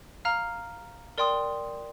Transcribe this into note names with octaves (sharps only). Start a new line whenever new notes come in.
F5 A#5 F6
A#4 D5 G5 C6 D#6